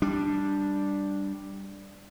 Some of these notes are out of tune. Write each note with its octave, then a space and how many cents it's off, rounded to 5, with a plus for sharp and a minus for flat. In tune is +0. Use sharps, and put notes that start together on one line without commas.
G3 +0 D4 +0